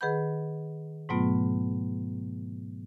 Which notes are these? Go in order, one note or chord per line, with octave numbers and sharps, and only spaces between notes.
D#3 G#4 B4 F#5 B5 G6
G#2 B2 F#3 A3 B3 F4